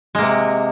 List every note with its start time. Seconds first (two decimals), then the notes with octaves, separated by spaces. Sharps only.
0.15 G#3
0.18 A#3
0.22 C3